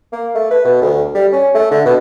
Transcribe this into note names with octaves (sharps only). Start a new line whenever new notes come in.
A#3
A3
B4
B2
D2
G3
C#4
A3
D3
B2